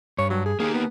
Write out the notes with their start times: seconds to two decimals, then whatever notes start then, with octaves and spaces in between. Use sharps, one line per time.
0.18 G2 C#5
0.30 F#3
0.46 G#4
0.60 A#3 D#4 G4 G#4
0.74 B3